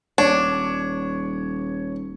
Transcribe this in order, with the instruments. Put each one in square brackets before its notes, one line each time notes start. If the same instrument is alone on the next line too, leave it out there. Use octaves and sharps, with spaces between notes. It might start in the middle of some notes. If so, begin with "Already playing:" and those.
[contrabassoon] D#1 [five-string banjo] D4 [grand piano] C#5